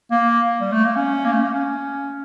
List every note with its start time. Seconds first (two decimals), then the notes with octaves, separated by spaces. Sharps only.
0.11 A#3
0.60 G3
0.72 A3
0.85 A#3
0.96 C#4
1.25 A#3
1.32 A3
1.40 A#3
1.54 C#4